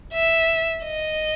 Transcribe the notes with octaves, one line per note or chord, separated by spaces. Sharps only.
E5
D#5